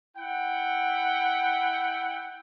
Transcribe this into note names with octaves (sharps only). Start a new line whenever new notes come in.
E4 F#5 G5